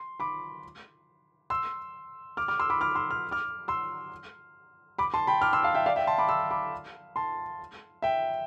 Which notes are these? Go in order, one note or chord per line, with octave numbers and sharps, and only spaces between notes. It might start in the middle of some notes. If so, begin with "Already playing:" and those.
Already playing: C6
B5 D6
C6 E6
D6 F6
D6 F6
C6 E6
B5 D6
D6 F6
C6 E6
F6
D6 F6
C6 E6
B5 D6
A5 C6
G5 B5
D6 F6
C6 E6
F5 A5
E5 G5
D5 F5
E5 G5
A5 C6
B5 D6
C6 E6
B5 D6
A5 C6
E5 G5